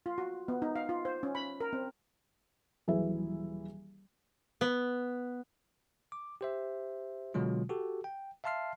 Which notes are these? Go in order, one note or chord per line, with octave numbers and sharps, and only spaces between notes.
F4
F#4
B3
D#4
F5
F4
C5
C#4
B5
A#4
C4
D#1 E3 F#3 E4 G#4 E5
B3
D6
G4 C5 E5
B2 D3 F#3 G#3 F4
F#4 G4 A4
G5
E5 F5 A5 C6 F6 C7